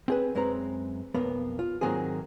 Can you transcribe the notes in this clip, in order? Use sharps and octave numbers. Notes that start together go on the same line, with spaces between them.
C4 G#4 B4
F#2 G#3 C4 B4 A#5
B1 F2 A#3 B3
F4
G#2 D#3 F#3 A#3 C4 G#4